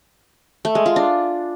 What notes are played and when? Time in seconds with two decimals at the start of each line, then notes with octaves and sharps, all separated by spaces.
0.65 A3
0.75 G#3
0.86 F4
0.96 D4